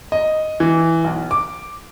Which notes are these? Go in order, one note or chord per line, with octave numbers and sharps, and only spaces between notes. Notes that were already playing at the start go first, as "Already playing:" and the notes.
D#5
E3
B1
D6